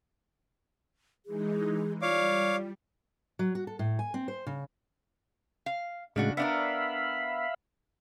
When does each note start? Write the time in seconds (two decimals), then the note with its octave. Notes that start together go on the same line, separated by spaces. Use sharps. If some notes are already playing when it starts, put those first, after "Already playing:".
1.26 E3 G#3 D#4 G#4
2.02 G3 F4 C#5 D5 F5 D6
3.39 F#3
3.55 F#4
3.67 A4
3.79 A2
3.99 G#5
4.14 C4
4.28 C5
4.47 C#3
5.66 F5
6.16 A2 C#3 G#3 D4 F#4
6.37 B3 D4 A#4 E5 F5 B5